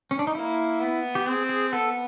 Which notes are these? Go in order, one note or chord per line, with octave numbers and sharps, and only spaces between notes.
C#4
D4
D#4
A#3 E4
B3
G4
C4 G#4
G#4
B3 A4